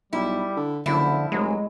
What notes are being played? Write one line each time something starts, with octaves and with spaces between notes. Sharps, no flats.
B1 G3 E4
D3
F#1 D3 F3 E4
F1 F#3 G#3